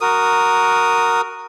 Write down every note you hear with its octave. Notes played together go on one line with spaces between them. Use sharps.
F#4 A#4 D#6